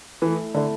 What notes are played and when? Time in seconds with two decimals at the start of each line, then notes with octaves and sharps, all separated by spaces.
0.22 E3 A3 E4 A4
0.54 D3 A3 E4 A4